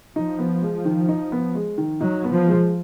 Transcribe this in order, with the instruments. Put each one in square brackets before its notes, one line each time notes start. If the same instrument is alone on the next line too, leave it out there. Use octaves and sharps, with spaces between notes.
[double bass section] F3 [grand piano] D#4
[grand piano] B3
G#3
D#3
D#4
B3
G#3
D#3
[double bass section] F#3 [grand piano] D#4
[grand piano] B3
[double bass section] F3
[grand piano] G#3